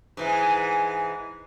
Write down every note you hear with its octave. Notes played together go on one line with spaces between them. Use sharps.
G#2 E3 G#3